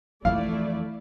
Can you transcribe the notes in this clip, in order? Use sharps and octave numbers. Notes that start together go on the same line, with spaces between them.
F2 E3 A3 E4 D5 F5